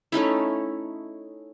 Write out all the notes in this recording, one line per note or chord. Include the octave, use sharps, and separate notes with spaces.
A3 C#4 D#4 E4